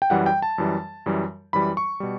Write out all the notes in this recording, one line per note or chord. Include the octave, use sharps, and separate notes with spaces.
G5
F#2 E3 G3 F#5
G5
A5
F#2 E3 G3
F#2 E3 G3
F#2 E3 G3 B5
C#6
B2 G3